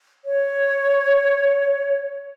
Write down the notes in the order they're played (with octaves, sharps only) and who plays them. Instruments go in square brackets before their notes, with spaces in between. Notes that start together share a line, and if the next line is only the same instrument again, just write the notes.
[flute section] C#5